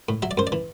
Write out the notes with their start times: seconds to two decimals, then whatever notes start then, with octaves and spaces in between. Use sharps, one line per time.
0.09 A2
0.22 F#3 E5
0.31 D5
0.37 F#2 C5
0.47 D5
0.52 E3